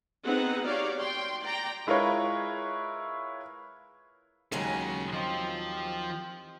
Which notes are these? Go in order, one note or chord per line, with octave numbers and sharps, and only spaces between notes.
B3 C4 D#4 G#4 F#5
D#4 F#4 G4 C#5 D5 F5
G5 C6
D5 G5 A#5
G#3 E4 F4 A#4 B4 C#5
D#2 C#3 F#3 G#3 G#5
F3 C4 F4 G4 D#5